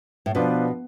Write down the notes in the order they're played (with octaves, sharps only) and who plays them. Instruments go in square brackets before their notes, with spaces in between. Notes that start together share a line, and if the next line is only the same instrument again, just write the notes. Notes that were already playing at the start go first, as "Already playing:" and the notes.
[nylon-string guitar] A2
[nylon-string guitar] B2 [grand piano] F3 B3 D4 F4 B4